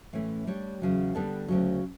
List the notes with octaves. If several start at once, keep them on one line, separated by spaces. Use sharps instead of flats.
A2 E3 A3 C#4
G3 D4 G4 C#5
E2 C#3 F#3
D3 G3 B3 D4 A4
D2 C#3 F#3